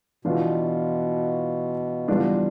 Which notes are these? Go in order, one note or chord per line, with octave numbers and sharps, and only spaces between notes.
B2 E3 B3 D4 F4
E3 G3 B3 D4 F4